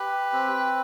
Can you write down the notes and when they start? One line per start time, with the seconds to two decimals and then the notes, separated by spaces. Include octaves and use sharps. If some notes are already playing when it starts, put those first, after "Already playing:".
Already playing: G4 B4
0.33 C4